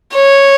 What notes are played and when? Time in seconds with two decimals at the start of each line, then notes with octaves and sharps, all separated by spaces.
0.15 C#5